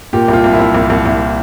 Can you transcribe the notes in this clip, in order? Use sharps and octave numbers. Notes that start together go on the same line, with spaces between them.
A#2 G4
C2 F4
C2
E4
C2
C2
C2
C2